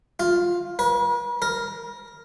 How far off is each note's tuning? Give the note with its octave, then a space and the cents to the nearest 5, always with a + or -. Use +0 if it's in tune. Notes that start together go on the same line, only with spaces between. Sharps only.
F4 +10
B4 -45
A#4 +0